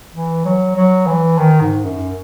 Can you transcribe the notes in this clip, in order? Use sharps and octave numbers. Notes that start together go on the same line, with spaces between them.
E3
F#3
F#3
E3
D#3
G#2
F#2